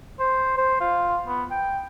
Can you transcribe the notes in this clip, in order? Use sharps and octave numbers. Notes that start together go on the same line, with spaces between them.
C5
C5
F4
B3
G5